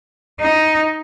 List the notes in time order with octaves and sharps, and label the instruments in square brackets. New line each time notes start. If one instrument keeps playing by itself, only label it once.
[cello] D#4